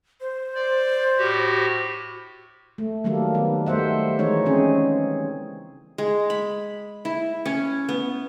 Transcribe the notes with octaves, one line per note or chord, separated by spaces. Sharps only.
C5
D5
A2 F#4 G4
A3
D#3 F#3 G3 A#3 A4
D#3 B3
G3 A3 C5 E5 F#5
E3 G#3 D#4 C#5
C#3 C4 C#4 G#4
G#3
B5
E4
C#4
B3